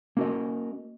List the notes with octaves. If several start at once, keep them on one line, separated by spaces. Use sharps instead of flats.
A#3 C#4 F#4 G#4 A#4 D#5